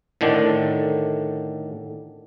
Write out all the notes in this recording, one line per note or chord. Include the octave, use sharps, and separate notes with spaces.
A2 D3 D#3 D4